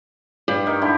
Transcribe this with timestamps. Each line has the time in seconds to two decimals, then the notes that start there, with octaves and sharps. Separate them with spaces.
0.48 G2 G4
0.67 D#3
0.81 D3 E4 G4